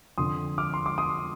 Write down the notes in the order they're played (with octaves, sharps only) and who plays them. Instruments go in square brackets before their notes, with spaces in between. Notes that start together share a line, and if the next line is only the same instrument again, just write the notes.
[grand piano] F2 D3 C6 D#6
D6 F6
C6
D6
C6 D#6